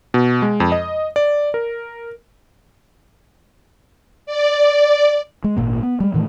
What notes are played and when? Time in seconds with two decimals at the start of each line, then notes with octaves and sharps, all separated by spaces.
0.14 B2
0.42 G#3
0.60 F2
0.72 D#5
1.16 D5
1.54 A#4
4.26 D5
5.44 G#3
5.57 G#1 A#2 A#3
5.83 B3
6.00 G3 G#3
6.14 A2 D#3 E3 A3